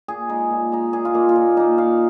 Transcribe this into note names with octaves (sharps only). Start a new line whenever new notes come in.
A#2 G#4
G#3 D#4
A#2
G#3 D#4
A#2 G#4
F4
A#3 D#4
F4
A#2
A#3 D#4
A#2 F5